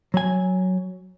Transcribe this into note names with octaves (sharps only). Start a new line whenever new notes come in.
F#3 G#5